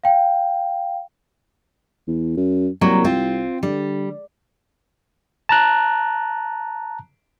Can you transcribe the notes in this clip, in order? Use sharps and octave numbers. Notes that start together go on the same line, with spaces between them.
F5 G5
E2
F#2
C2 F#3 G3 A#3
C4 F4
D3 G3
A5 A#5 F#6